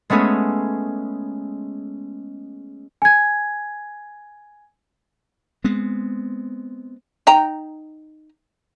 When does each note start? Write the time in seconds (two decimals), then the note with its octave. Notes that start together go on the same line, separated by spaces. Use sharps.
0.10 G#3 A3 B3 C#4 G#4
3.02 G#5 G#6
5.64 G#3 B3 C4
7.27 D#4 G5 A#5